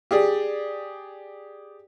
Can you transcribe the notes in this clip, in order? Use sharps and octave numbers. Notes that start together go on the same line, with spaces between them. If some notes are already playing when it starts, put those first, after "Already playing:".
G4 G#4 D5